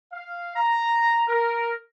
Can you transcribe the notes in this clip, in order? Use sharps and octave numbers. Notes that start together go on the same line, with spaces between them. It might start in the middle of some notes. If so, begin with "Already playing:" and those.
F5
A#5
A#4